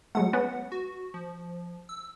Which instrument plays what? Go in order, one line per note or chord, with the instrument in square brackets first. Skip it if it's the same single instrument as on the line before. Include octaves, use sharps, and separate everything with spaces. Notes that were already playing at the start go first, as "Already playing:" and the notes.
[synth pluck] F#3 G#3 A3 [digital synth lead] F#5
[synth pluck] B3 C#4
[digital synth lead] F#4
F3
E6